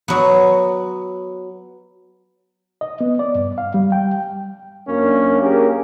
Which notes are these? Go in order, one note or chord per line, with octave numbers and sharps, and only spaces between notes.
F#3 B3
D#5
B3
D5
G2
F5
G3
G5
F#2 A#3 C#4 D4
A#3 C#4 G4 G#4 A#4